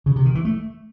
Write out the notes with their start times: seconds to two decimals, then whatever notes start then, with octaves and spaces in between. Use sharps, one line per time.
0.06 C#3
0.16 C3
0.25 D#3
0.35 E3
0.45 A3